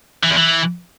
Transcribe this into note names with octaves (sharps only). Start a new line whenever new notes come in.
E3
E2
E3